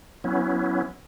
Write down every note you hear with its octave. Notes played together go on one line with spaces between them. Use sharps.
F#3 B3 C#4 E4